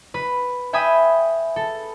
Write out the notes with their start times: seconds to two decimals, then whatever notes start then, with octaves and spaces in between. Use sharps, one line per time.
0.14 B4
0.73 E5 G5 G#5 B5 D#6
1.56 A4